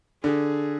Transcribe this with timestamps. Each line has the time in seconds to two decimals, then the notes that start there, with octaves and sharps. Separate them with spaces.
0.23 D3 G#4